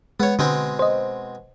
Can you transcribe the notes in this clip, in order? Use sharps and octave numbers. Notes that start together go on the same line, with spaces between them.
G#3 B3 C#5
B2 D3 G#3 C4
C5 D#5